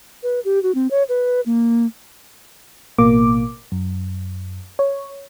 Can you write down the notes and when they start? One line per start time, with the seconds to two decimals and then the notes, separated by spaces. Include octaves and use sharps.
0.23 B4
0.45 G4
0.63 F#4
0.75 C4
0.91 C#5
1.09 B4
1.46 A#3
2.98 A1 B2 A#3 D6
3.72 F#2
4.79 C#5